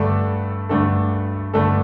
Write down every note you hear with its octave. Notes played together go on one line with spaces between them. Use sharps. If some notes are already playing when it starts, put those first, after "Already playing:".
Already playing: G2 D3 A3 D4 A4
G2 D3 A3 D4 A4
G2 D3 A3 D4 A4